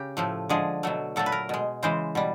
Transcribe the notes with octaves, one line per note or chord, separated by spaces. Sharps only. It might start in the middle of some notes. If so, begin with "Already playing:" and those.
Already playing: C#3 G4
A2 F3 A3
D3 F3 G#3 G#4
B2 F#3 A3
A#2 F#3 A3 A4
B4
A#4
B2 G#3
C#3 E3 G#3 C5
B2 G3